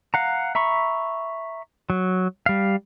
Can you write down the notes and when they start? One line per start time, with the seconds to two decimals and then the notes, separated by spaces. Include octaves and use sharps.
0.14 F5 F#5 A#5
0.55 E5 A#5 B5 C#6
1.90 F#3
2.46 G3 F5